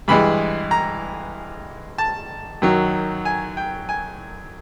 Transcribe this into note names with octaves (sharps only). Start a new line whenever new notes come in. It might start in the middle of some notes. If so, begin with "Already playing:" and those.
G2 E3 G#3 B5
A#5
A5
F#2 D#3 F#3
G#5
G5
G#5